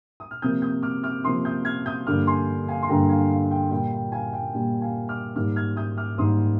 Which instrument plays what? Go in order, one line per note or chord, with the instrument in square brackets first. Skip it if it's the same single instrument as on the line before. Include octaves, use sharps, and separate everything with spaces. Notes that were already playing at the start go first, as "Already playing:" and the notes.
[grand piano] D#6
F6
C3 F3 A#3 D#6 G6
D#6 G6
D6 F6
D6 F6
C3 F3 A#3 C6 D#6
D#6 G6
F6 G#6
D#6 G6
G2 D3 G3 A#3 D6 F6
G#5 C6
F5 G#5
C6
G2 D3 G3 A#3 G5 A#5
F5 G#5
F5
G5
A#2 G3 A#3 G5
G5
F5 G#5
G5
A#2 G3 A#3 G5
F5 G#5
D6 F6
G#2 D#3 G3 A#3 D6 F6
F6 G#6
D#6 G6
D6 F6
G#2 D#3 G3 A#3 C6 D#6